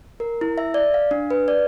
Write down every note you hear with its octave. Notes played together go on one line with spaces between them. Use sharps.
A#4
E4
E5
D5
F5
D4
B4
D5